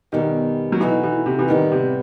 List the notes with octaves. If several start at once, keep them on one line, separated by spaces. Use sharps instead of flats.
E2 B2 D#3 G3
F#3
B2 E3 A3 D#4 F#4
E3
C3
E3
A2 D#3 G3 B3
C3